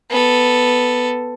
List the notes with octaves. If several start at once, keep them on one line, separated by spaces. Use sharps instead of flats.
B3 A4